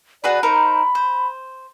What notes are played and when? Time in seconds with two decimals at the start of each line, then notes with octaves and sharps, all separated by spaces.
0.24 F#4 G#4 B4 D5
0.43 D#4 A#4 C5 B5
0.95 C5